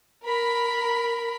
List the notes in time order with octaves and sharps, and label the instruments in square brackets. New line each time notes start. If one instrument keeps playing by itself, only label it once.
[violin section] A#4 B5